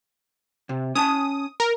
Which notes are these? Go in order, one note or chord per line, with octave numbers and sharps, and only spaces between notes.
C3
C#4 G#5 A5 D#6
A#4